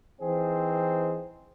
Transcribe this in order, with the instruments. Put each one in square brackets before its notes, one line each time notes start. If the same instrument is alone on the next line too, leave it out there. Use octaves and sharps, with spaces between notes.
[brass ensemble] E3 C4 D#4 G#4 C5